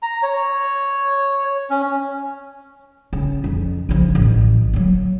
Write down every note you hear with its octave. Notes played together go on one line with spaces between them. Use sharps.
A#5
C#5
C#4
C#3
F2 C#3
C#3 F3
A1
F#3 A#3